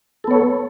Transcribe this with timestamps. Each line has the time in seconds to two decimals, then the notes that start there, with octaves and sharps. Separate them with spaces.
0.24 A4
0.27 B3
0.31 C#5